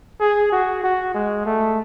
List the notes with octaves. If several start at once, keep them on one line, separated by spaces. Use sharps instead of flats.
G#4
F#4
F#4
G#3
A3